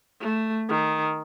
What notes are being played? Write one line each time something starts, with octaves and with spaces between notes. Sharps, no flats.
A3
D#3